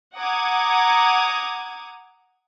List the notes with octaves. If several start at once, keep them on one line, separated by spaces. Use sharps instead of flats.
F#5 A#5 D6 D#6 G#6